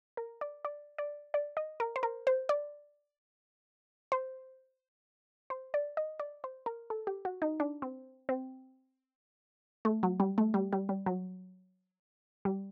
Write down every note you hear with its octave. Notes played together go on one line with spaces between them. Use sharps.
A#4
D5
D5
D5
D5
D#5
A#4
C5
A#4
C5
D5
C5
C5
D5
D#5
D5
C5
A#4
A4
G4
F#4
D#4
D4
C4
C4
A3
F#3
G3
A3
G3
G3
G3
F#3
G3